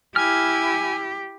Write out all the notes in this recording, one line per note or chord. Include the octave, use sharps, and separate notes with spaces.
E4 G4 G#5 F6